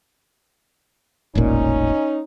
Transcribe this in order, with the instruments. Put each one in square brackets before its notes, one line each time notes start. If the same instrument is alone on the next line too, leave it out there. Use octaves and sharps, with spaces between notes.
[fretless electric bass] E1 A1 A#2 [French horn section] C#4 D#4